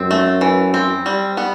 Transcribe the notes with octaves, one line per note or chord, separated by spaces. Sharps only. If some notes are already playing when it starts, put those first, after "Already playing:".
Already playing: F#2 C4
A3
E3
C4
G3
B3